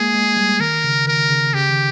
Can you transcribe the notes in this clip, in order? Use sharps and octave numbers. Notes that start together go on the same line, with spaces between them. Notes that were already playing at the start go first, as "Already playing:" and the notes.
Already playing: G#3 A#3 G#4
G#3
G3
D#3 A#4
C#3
D#3 A#4
C#3
C#3 G4
D#3